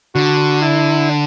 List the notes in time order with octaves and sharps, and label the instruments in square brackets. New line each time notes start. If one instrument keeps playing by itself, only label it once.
[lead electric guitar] D3 [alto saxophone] F#4
[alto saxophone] E4
D4